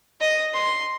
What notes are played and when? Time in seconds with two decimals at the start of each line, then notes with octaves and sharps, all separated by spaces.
0.21 D#5
0.54 C6